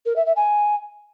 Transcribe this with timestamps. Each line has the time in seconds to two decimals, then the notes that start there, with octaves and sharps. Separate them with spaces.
0.06 A#4
0.16 E5
0.26 E5
0.36 G#5